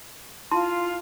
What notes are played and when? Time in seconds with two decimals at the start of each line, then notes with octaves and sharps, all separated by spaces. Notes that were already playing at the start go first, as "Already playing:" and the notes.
0.51 E4 F4 A5 C6